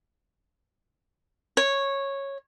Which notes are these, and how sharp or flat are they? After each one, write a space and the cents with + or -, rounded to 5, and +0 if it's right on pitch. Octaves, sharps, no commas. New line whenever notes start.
C#5 -10